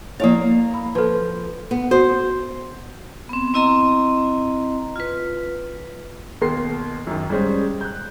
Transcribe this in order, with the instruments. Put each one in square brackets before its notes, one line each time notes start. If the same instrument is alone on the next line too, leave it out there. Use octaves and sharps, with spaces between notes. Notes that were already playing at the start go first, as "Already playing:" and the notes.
[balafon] F3 E4 C#5 [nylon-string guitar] A#3 F5
[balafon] B5
[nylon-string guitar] F3 [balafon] A4 B4
[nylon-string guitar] B3
[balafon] F#4 [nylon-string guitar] C5
[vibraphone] B3 C4
C4 E4 D#5 A#5 C6
F4 B4
[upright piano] D#2 B2 A#4 C6 C7
F#2 D#3
G3 G#3 C#4 C5
F#6 G6